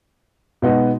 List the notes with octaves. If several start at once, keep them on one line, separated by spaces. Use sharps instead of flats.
B2 G#3 B3 D#4 F#4